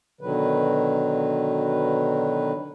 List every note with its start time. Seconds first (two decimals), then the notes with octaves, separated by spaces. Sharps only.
0.21 B2 D3 D#3 F#3 B4